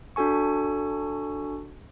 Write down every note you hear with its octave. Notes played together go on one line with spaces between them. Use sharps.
D4 F#4 A4 G#5 C#6